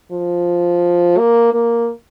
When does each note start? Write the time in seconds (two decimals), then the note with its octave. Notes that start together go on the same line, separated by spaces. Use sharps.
0.12 F3
1.18 A#3
1.53 A#3